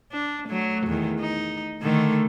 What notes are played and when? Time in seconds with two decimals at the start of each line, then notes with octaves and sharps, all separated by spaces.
0.12 D4
0.48 F#3 A3
0.86 E2 D#3
1.20 D#4
1.82 D3 D#3 A3